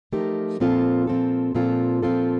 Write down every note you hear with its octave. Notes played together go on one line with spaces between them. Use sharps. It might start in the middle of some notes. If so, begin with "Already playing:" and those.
F3 A3 D#4 G4 A#4
A#2 F3 C4 F4 A4
A#2 F3 C4 F4 A4
A#2 F3 C4 F4 A4
A#2 F3 C4 F4 A4